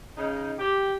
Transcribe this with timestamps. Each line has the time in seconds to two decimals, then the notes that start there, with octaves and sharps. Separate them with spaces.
0.17 C#3 D#4
0.58 G4